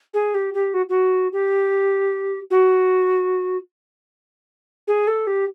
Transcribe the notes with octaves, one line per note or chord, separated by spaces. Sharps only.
G#4
G4
G4
F#4
F#4
G4
F#4
G#4
A4
G4